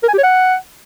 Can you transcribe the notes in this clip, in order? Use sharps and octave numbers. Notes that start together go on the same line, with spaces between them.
A#4
G#5
G4
C#5
F#5